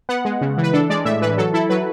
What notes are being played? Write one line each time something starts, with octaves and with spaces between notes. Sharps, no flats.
B3 F#5
G#3
C#3
E3
B4
D4 A4
G#3 D5
A2 E5
E3 B4
F#3 A4
E4 A4
F#3 B4